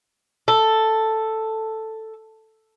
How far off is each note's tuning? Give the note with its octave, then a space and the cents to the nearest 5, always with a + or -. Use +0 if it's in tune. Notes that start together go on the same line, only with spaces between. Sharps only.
A4 +5